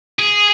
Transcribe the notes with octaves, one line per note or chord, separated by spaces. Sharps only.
G#4